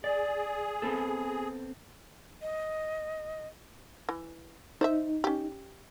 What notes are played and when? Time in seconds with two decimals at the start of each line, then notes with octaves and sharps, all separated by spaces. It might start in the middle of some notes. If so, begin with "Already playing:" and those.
0.04 G#4 D5
0.82 B3 C4 A4
2.42 D#5
4.09 E3
4.81 D#4 C5 D5 E5
5.24 C#4 G4